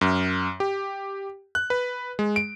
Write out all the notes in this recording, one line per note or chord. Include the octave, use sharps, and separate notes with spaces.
F#2
G4
F#6
B4
G#3
D7